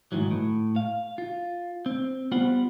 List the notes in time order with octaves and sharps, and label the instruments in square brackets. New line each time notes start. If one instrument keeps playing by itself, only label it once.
[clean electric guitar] G#2 C3 D#3 E3 F#3
A2
F5
F4
C4
G3 B3 F4 C5 F#5